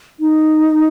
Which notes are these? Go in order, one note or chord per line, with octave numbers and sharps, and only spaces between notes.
D#4